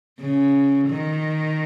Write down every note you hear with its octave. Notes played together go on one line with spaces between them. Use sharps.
C#3
D#3